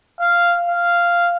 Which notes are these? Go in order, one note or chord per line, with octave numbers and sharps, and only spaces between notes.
F5
F5